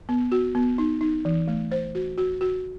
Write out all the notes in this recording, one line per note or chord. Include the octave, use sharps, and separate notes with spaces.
B3
F#4
B3
D#4
D#4
E3
A3
C5
F#4
F#4
F#4